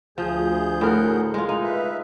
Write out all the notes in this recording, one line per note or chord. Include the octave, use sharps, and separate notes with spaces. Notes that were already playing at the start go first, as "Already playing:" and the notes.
D2 F3 G#4 G6
A2 A#4 F#5
G#3 F4
D#4
B4 E5